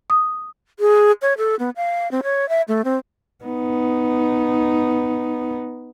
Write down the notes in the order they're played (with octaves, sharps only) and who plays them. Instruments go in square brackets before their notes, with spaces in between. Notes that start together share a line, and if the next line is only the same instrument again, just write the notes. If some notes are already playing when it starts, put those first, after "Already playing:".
[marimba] D#6
[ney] G#4
C#5
A4
B3
F5
C4
C#5
E5
A3
C4
[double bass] B3 D#4